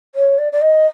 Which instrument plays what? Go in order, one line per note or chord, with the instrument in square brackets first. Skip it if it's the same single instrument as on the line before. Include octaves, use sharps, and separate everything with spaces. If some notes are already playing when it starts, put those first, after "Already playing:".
[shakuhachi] C#5
D5
D5
D#5